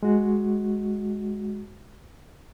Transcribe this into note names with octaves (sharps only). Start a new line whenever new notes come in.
G#3 F#4